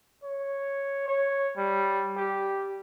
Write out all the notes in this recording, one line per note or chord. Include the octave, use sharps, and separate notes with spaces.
C#5
C#5
G3
G4